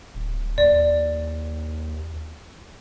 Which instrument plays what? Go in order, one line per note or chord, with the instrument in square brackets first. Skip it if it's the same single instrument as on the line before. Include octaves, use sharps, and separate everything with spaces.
[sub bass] D1
[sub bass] D#2 [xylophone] D5